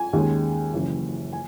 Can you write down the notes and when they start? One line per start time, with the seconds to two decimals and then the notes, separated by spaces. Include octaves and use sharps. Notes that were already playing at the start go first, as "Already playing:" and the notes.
Already playing: G#5
0.13 D#2 D#3 G#3 C#4
0.73 F#1 F#2 E3
1.33 G#5